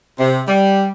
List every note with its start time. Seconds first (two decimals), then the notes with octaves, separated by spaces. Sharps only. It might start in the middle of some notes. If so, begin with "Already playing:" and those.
0.19 C3
0.47 G3